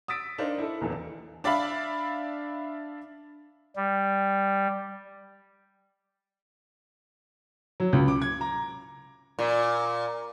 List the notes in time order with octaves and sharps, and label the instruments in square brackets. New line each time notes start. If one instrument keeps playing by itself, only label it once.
[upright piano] D#6 E6 A6 B6 D7
D4 D#4 A#4 C5 F5
E4 A4
D#1 B1 E2 E3 A4
[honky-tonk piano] D4 D5 E5 F5 B5
[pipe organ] G3
[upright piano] F#3
C#2
D6
G#6
A#5
[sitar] A#2